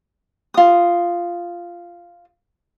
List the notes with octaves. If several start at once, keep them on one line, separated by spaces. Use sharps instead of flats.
F4 D#6